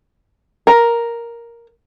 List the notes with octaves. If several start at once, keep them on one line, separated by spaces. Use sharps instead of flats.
A#4